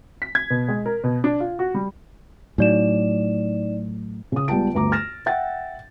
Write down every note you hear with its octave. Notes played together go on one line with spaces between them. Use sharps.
B6
G#6
B2
G#3
A#4
B2
D4
F4
F#4
G3
A2 F#3 D#4 D5 E7
C#3 D#6
C#2 G3 B3 G5 A5 D7
G1 D2 A#5 D6
F6 A6 A#6 E7
E5 F#5 G5 A6